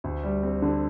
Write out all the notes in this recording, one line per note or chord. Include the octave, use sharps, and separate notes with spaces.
D2
G3
C4
D3